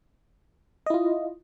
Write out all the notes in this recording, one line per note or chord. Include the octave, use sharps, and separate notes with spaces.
E4 F4 D#5